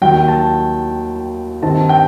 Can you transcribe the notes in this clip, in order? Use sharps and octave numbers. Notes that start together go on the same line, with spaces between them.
D#2 D#3 F#3 G5
A5
G2 D#3 G3 C4 D#4 A5
G5